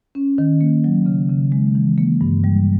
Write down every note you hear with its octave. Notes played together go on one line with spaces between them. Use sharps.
C#4
D#3
A#3
F#3
C#3
C#3
G#3
E3
A#3
G2
G3